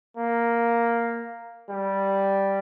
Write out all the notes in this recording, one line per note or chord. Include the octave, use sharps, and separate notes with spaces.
A#3
G3